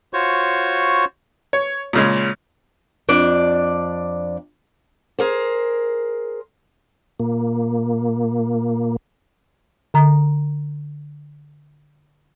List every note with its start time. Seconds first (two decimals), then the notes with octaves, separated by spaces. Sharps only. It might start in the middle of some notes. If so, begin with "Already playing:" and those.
0.14 F4 F#4 C5 C#5 C#6
1.53 C#5
1.93 A#2 C#3 G#3
3.09 F2 D4 D5
5.19 G#4 A#4 C5
7.20 A#2 A#3
9.94 D3 A#5